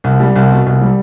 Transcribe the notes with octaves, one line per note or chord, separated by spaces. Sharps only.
C2
G3
C2
B2
C2
G3